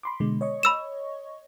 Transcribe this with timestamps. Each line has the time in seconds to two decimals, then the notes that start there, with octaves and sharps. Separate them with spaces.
0.03 B5 C6 D6
0.20 B2 D3 G#3
0.41 C#5 D#5 C#6
0.63 B5 E6 E7